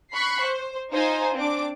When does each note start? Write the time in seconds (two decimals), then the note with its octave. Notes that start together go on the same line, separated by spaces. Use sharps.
0.12 B5 C#6 F#6 B6 C7
0.44 C5
0.92 D#4 F4 C5 G#5
1.37 C4 D4 D6